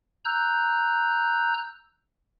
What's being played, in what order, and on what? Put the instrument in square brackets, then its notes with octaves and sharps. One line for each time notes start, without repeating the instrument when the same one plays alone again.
[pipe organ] A#5 E6 F#6 G6